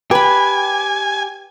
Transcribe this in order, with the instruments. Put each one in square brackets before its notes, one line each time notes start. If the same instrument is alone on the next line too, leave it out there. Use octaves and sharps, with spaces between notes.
[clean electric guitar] G4 [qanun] B4 B5 [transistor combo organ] G#5